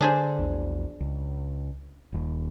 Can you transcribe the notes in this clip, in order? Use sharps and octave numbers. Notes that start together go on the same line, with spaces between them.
D3 D4 G#4 C5
A#1 E2
C#2
D#1 D#2